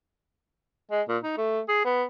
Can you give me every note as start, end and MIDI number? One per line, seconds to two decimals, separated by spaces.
0.91 1.02 56
1.09 1.18 46
1.24 1.36 63
1.38 1.60 57
1.69 1.82 68
1.85 2.04 59